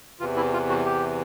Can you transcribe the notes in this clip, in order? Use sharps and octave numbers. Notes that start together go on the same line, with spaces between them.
E2 C3 E3 F4
E4
F4
F#4
G4